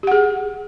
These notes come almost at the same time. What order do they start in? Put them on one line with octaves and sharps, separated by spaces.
G4 F#5 G#4